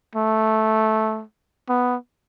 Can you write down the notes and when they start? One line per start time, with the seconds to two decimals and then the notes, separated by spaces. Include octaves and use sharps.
0.15 A3
1.69 B3